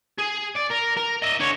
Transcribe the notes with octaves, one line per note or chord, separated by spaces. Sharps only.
G#4
D5
A#4
A#4
D#5 E5
D3 C#5